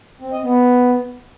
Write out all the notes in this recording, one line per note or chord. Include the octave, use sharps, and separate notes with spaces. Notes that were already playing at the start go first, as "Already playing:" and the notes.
C4
D#5
B3